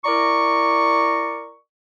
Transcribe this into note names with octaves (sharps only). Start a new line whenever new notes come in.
E4 A#4 D5 A#5 C#6